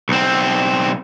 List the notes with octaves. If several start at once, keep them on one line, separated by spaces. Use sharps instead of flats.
B1 C4